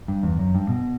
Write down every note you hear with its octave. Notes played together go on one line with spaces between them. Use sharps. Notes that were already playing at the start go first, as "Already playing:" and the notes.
G2
E2
F#2
G2
B2